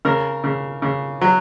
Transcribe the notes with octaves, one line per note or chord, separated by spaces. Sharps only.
C#3 A#4
C#3
C#3
F#3